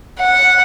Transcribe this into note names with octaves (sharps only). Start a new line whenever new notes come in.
F#5